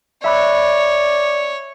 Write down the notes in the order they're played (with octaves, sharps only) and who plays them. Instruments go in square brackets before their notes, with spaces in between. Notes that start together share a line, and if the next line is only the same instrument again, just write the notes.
[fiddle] C#5 [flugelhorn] D5 [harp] E5 B5 F#6